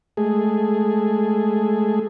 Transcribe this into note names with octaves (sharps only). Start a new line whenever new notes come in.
G#3 A3 G#4